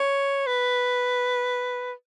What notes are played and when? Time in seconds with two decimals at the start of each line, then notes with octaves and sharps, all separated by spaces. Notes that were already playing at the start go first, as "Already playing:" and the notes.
Already playing: C#5
0.47 B4